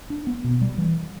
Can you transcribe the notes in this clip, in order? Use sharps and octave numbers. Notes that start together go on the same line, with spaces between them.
D4
B3
B2
G3
E3